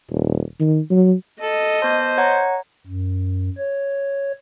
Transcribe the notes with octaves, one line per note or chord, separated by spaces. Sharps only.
D#1
D#3
F#3
A4 D#5
B3 C5 A5
C#5 F#5 A#5
F#2
C#5